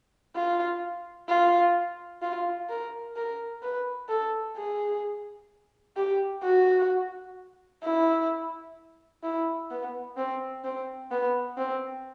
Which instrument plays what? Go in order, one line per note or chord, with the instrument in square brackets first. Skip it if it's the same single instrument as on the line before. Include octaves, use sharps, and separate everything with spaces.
[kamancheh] F4
F4
F4
A#4
A#4
B4
A4
G#4
G4
F#4
E4
E4
B3
C4
C4
B3
C4